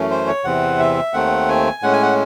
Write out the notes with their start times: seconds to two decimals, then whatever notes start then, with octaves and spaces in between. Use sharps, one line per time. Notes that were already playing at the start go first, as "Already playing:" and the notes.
Already playing: F#2 E3 A3 C#4
0.10 C5
0.27 C#5
0.44 E2 C3 E3 C4 F#5
0.80 E5
1.13 D#2 D#3 A3 C4 F#5
1.49 G#5
1.82 A2 G#3 C#4 F#5
1.93 G#5
2.03 F#5